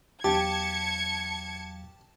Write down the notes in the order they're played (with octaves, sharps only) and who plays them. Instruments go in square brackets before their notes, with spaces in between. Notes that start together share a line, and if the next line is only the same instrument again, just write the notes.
[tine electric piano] E2 F#3 F5 [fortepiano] G4 [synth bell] A5 [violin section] G#6 C#7